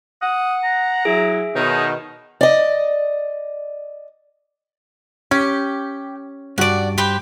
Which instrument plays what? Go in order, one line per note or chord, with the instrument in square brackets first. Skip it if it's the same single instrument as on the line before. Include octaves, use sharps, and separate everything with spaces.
[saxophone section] F#5 [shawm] D#6
[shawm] A#5
[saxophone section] F#3 E4 [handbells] G#4 E5
[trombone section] B2 D#3 [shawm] D#4 [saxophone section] B4 C#5
[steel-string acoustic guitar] D5 D#5
[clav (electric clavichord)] C#4 [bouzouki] G4
[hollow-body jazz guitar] G2 F#4 [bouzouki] D5 F#5
[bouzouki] G4 B4 C5